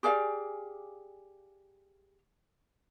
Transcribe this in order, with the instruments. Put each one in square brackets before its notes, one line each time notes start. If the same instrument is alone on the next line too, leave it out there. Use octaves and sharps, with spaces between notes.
[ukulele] G4 G#4 D5 F5